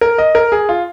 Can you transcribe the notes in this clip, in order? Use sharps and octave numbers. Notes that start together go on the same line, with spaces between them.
A#4
D#5
A#4
G#4
F4